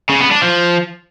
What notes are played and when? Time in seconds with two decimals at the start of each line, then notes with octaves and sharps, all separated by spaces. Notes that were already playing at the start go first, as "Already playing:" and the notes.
0.09 C#3
0.20 B3
0.31 D4
0.42 F3